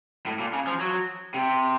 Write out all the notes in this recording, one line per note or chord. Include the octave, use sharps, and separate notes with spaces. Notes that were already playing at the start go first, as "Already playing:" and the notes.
A2
A#2
C#3
F3
F#3
C3